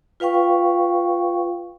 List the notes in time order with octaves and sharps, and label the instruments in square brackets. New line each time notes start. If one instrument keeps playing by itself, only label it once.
[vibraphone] F4 B4 F5 G5 C#6